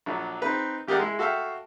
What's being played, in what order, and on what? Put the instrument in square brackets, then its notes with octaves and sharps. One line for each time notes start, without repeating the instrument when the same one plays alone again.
[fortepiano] A#1 F#3 D4
C4 D#4 B4
A1 G4 G#4 A#4 D5 F#5
G#3 E4
F#4 A4 E5 F5 G5